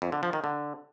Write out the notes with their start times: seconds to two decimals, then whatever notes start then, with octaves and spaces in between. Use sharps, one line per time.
0.02 F2
0.12 D3
0.23 F3
0.33 D#3
0.44 D3